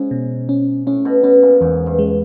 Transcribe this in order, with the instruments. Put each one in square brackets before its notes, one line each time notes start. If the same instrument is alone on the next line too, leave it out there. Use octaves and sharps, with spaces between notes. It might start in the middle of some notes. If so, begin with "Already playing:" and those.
Already playing: [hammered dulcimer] G#2 [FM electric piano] C#4
[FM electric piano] B2
C#4
[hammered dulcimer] A2 [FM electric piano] C#4
[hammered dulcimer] B2
[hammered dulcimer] B2 [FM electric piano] C#4
[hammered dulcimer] A#2
[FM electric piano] E2 [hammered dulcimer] G#2
[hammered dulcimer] G2
[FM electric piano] G#3